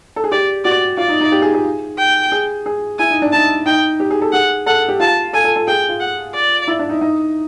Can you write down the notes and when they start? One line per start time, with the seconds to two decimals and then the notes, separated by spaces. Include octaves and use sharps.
0.16 A4
0.24 G#4
0.32 G4 D5
0.64 F#4 D5
0.97 F4 D5
1.09 D#4
1.20 D#4
1.32 G4
1.42 G#4
1.54 G#4
1.98 G5
2.32 G#4
2.66 G#4
2.98 E4 G#5
3.10 D#4
3.22 D4
3.32 D#4 A5
3.66 D#4 G5
4.00 G4
4.11 G#4
4.22 A4
4.32 G#4 F#5
4.66 A4 F#5
4.88 G4
5.00 F4 A5
5.33 A4 G#5
5.44 A4
5.56 A4
5.67 G#4 G5
5.89 F4
6.00 F#5
6.34 D5
6.68 E4
6.79 D4
6.89 D#4
7.01 D#4